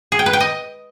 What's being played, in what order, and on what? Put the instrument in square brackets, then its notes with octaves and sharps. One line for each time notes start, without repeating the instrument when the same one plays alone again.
[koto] G#4
G5
B4
G5
D#5